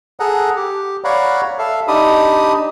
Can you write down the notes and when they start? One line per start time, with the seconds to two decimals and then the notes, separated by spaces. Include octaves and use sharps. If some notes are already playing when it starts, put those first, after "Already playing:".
0.20 G#4 A4 F#5 A#5
0.56 G4
1.04 C#5 D5 F5 F#5 A#5 B5
1.59 A4 E5 F5
1.88 D4 D#4 G4 B5 D#6